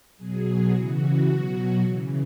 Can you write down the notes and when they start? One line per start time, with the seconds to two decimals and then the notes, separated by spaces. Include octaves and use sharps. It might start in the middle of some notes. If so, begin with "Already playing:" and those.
0.17 B2 F#3 G#4
0.71 C#3 E3 F#4
1.26 B2 F#3
1.80 C#3 E3